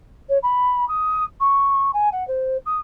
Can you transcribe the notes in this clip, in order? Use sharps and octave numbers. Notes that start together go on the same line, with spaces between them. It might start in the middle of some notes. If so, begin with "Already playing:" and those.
C#5
B5
D#6
C#6
G#5
F#5
C5
D#6